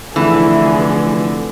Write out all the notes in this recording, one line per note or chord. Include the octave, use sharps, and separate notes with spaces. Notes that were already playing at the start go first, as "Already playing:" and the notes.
F1 D3 E3 G#4